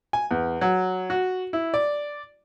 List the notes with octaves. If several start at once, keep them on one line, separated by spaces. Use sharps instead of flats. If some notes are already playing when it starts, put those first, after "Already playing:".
G#5
E2
F#3
F#4
E4
D5